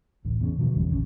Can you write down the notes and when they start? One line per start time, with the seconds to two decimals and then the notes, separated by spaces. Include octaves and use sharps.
0.25 D1 A1 D2
0.40 E2 C#3
0.58 B2 D3 F3 F#3
0.75 G#1 E2 C#3 G3
0.90 D1 G#1 A#3 C#4